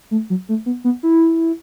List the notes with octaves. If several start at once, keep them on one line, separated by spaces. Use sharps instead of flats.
A3
F#3
A3
B3
B3
E4